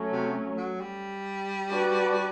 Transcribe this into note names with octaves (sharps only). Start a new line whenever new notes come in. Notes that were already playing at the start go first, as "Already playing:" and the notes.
Already playing: F#3 A3 C#4
C3
F#3
G3
D4 F#4 B4 D5